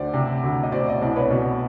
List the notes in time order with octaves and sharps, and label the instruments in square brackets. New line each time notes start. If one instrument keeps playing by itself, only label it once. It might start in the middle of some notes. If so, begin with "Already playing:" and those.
Already playing: [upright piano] D2 C5 D5
C3
D2
D#5
B2 C5 D5
D#5
C2 D5
B4 C#5
B2